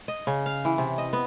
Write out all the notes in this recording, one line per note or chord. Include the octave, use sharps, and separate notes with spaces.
D#5
C#3
F5
E3
C3
D#5
B3